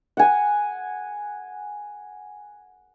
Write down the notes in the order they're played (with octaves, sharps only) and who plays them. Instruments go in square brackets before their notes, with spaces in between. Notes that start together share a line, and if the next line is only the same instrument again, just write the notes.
[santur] F#5 G#5